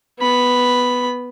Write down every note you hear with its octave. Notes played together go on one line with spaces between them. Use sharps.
B3 B5